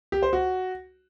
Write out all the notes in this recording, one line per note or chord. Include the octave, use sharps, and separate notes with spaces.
G4
C5
F#4